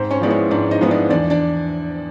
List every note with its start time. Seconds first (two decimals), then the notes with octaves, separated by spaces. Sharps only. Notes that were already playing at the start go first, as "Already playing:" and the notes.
Already playing: G#2 C4 C5
0.11 C#4 C#5
0.21 F3 G#3 B3 E4 D5
0.30 C#4 C#5
0.50 G#2 D4 D5
0.71 D#4 D#5
0.81 F3 G#3 B3 E4
0.91 D4 D5
1.10 E2 D4 D5
1.30 D4 D5